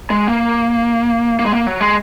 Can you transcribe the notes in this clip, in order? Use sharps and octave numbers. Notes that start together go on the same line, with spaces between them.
G#3
A#3
A#3
G#3
A#3
F#3
G#3